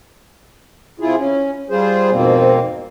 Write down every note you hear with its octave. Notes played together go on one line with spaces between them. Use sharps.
C3 E4 F4 G#4
C#4
G3 F4 G#4 C5
F2 G#2 B2 A#3 C4